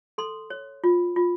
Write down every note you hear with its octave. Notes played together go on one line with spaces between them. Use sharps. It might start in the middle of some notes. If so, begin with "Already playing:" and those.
A4 C6
C#5
F4
F4